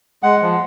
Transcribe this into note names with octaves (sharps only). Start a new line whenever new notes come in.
G#3 F#5
F3